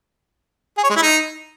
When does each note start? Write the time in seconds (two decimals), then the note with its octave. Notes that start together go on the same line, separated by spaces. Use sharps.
0.77 G#4
0.84 C#5
0.90 G#3
0.96 E4
1.03 D#4